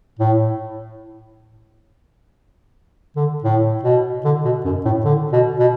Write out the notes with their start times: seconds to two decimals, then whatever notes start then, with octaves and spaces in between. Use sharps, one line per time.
0.19 A2
3.16 D3
3.44 A2
3.84 B2
4.25 D3
4.44 B2
4.65 F#2
4.85 A2
5.05 D3
5.32 B2
5.59 B2